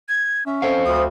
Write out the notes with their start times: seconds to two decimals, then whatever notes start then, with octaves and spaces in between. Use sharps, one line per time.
0.09 G#6
0.46 C#4 E5
0.62 A4 C5 F5
0.85 D2 D#6